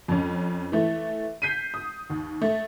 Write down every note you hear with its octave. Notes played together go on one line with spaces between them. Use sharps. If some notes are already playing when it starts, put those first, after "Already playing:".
F2 C#4
E3 A3
G6 B6 C7 D#7
D#6
D#2
A3